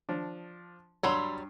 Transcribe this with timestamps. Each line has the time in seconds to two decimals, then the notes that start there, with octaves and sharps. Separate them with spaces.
0.09 F3 D4
1.03 G2 F#3 G3 C#5 B5 C6 E6